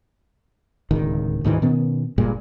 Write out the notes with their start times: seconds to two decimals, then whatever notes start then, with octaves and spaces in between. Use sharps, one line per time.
0.91 D1 C#2 D#3
1.44 D2 G#2 D#3 E3
1.62 B2 D#3 B3 C#4
2.18 F#1 G2 A#2 G#3